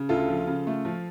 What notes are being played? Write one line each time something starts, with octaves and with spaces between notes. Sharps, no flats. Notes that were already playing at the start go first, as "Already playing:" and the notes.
Already playing: C#3
D2 F4 A4
F3
C#3
A3
F3